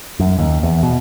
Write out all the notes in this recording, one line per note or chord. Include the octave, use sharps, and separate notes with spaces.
F#2
D#2
E2
B2